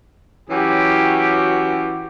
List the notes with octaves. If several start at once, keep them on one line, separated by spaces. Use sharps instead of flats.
E3 F#3 C#4 F#4 G4